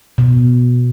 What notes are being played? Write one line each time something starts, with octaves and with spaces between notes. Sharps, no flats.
B2